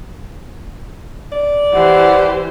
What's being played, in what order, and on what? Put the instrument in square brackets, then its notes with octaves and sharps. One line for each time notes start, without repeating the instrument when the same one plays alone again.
[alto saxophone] D5
[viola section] E3 G4 C5 [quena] F#5